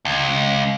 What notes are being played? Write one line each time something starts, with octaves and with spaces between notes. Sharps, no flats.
C#2